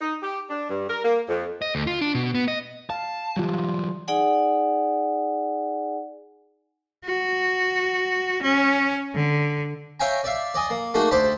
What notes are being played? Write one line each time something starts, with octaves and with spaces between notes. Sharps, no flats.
D#4
G4
D4
G2
A#4
A#3
F2
D#5
D2
F4
D4
B2
B3
D#5
F5 A5
E3 F#3 G3 F4
D#4 G#4 D5 F#5 G#5
F#4
C#4
D3
C#5 E5 F5 G5 G#5 A#5
D5 E5 F5
D5 D#5 G#5 D#6
A#3
A3 A#3 D#4 F#4 G#4
D2 C5 D5 A5 B5